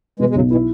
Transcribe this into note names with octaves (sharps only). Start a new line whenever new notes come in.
B2 E3 G#3
G#3
B1 C#3 F#3
B2 E3 E4